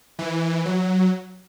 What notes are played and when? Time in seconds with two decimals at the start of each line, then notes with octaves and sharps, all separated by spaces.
0.19 E3
0.65 F#3